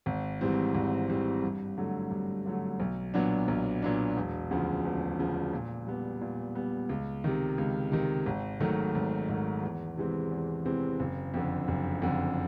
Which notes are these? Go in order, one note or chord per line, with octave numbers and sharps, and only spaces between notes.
G#1
G#2 E3 G3 C4
G#1
G#2 E3 G3 C4
G2
D3 F#3 A3
G2
D3 F#3 A3
B1
A#2 F#3 B3 D4
B1
A#2 F#3 B3 D4
E1
D2 C#3 F3
E1
D2 C#3 F3
A#2
G3 B3
A#2
G3 B3
C#2
C3 D#3
C#2
C3 D#3
G#1
G#2 D#3 F#3 A3
G#1
G#2 D#3 F#3 A3
E2
C3 E3 G#3 C4
E2
C3 E3 G#3 C4
F#1
F2 D3
F#1
F2 D3